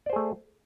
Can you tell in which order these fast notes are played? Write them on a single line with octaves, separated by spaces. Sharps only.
D5 C5 G#4 A3